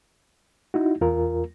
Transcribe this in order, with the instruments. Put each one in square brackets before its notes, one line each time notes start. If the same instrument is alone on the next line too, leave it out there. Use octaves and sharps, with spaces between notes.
[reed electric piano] D#4 E4 F#4
E2 F4 A#4